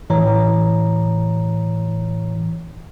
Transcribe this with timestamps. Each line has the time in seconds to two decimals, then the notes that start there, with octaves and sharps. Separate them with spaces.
0.10 A2 E3 C#5 A#5